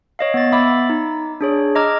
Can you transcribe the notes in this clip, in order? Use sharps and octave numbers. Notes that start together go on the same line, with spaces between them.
C#5 D#5 F5
B3 A6
B3 E5 B5 D6 E6 A6
D#4
D4 G#4 C#5
D#5 A#5 D6 E6 F6 G#6